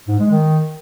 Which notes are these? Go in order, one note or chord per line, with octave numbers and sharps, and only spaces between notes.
G#2
G#3
D#3